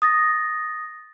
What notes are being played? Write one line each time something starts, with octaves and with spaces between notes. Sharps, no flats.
D#6 A6 A#6